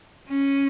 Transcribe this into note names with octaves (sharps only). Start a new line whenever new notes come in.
C#4